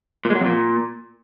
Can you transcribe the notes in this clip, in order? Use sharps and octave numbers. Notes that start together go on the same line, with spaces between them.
A#2
G#3
F#3
F2
A#2